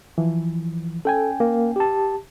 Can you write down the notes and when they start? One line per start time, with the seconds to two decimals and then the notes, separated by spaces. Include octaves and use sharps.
0.18 E3 F3
1.05 C#4 A4 G5 G#5
1.40 A#3
1.76 G4 A5